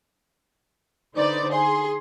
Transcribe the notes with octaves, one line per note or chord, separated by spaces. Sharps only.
D3 D#4 B4 C5 D5
G#4 C6